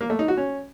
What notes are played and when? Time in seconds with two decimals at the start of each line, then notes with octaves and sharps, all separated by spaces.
0.01 A#3
0.10 A3
0.19 D#4
0.28 F#4
0.37 C#4